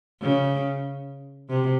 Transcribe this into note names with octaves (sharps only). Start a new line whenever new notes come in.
C#3
C3